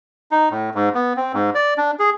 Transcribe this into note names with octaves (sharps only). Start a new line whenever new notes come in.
D#4
A2
G#2
B3
C4
G#2
D5
D4
G#4